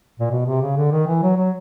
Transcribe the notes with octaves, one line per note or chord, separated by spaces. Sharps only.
A#2
B2
C3
C#3
D3
D#3
E3
F#3
F#3